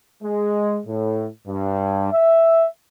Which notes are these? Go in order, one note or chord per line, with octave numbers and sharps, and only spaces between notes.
G#3
A2
G2
E5